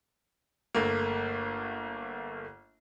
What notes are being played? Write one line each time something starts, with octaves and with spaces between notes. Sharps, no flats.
G1 A3 A#3